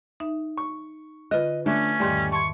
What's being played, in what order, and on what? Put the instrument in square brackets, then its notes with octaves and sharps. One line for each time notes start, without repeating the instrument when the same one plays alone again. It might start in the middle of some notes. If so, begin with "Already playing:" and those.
[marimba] D#4 E5
[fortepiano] C#6
[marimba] D3 F4 [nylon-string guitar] B4 D#5
[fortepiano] D3 [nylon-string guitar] A3 [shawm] C#4 [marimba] F#6
[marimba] E2 G#2 D#3 [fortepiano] G3
[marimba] A5 C6 G#6 [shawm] C#6